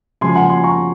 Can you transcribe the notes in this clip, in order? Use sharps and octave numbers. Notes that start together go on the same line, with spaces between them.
C#3 F3 G#3 G#5 C6
F#5 A#5
G#5 C6
A#5 C#6